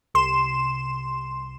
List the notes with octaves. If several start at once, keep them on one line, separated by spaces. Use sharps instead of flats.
C2 C6 E7